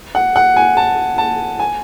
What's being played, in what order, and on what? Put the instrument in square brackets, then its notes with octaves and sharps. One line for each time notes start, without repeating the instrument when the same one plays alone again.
[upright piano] F#5
F#5
G#5
A5
A5
G#5